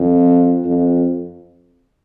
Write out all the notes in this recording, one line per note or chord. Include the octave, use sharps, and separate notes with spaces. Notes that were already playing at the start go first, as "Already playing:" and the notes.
Already playing: F2
F2